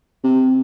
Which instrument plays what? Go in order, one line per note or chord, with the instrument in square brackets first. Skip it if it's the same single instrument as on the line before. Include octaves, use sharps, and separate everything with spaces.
[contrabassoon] C3